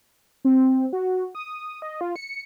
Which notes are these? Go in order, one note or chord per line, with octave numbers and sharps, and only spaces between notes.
C4
F#4
D#6
D#5
F4
C#7